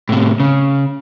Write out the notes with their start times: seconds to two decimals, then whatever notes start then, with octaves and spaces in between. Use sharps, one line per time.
0.09 A2 C3
0.40 C#3